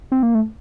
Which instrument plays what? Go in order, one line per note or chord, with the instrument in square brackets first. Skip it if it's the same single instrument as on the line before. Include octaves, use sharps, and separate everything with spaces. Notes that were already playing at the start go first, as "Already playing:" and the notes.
[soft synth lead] C4
A#3
A3